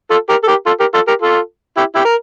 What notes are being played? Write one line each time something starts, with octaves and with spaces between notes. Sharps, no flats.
F4 A4
G4 A#4
A4
G4 A#4
F4 A4
G4 A#4
F4 A4
G4 A#4
F4 A4
E4 G4
E4 G4
A#4